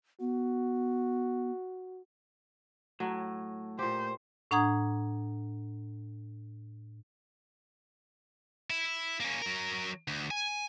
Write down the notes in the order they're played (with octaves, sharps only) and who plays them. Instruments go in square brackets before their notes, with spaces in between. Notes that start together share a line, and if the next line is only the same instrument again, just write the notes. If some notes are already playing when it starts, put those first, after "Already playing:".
[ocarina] B3 [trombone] F#4
[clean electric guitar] A2 [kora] F#3
[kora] A#2 G4 [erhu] C5
[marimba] A2 D4 F#5 A#5 D#6 G#6
[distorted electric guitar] E4
A#3 C#4
F#3 A#4
D2
G#5